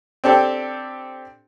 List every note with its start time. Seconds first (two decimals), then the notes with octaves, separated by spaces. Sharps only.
0.24 C4 D4 G4 A4